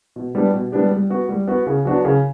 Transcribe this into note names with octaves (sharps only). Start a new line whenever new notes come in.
B2
G3 B3 D4 G4
B2
G3 B3 D4 G4
G3
B3 F#4
G3
B3 F#4
C#3
F#3 B3 D4 F#4
C#3